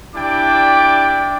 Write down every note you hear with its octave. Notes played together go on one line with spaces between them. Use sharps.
D4 E4 G4 D5 G5 D6